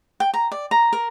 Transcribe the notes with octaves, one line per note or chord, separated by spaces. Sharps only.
G5
A#5
D5
A#5
A#4